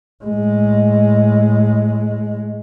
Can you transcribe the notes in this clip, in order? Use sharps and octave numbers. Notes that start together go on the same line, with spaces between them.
A2 G#3